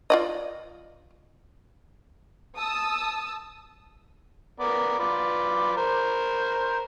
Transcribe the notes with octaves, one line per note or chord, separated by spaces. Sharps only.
F4 D5 D#5
A5 D#6 E6
B3 A#4 D5
F4 B4 D5
A#4 C5